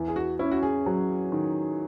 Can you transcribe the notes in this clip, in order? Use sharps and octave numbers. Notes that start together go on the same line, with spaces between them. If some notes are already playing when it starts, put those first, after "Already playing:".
Already playing: E2
G#4
F#4
C#4 E4
F#4
G#4
F#3
D#3